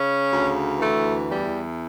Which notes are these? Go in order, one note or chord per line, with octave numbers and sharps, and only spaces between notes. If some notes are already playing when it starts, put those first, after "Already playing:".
Already playing: C#3 C#4
D2
E3 A3
E2 G3